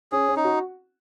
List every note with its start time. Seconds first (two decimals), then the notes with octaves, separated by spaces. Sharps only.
0.12 C#4 G#4
0.28 C#4
0.36 D#4
0.44 F#4